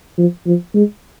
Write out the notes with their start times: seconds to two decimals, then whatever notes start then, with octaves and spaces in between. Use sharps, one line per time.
0.18 F3
0.46 F3
0.74 G#3